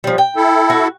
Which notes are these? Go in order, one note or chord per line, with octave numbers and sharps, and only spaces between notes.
F3 G3
G5
E4 A4
F#4